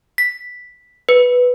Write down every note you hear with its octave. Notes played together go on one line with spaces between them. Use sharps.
B6
B4